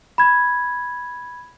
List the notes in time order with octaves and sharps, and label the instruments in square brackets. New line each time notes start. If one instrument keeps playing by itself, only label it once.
[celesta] B5 G#6